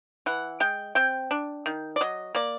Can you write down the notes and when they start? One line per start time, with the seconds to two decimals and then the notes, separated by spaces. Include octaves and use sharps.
0.26 E3 F#5
0.60 G#3 G5
0.95 C4 G5
1.31 D4
1.66 D#3
1.96 D5
2.01 F#3 D#5
2.35 A#3 D5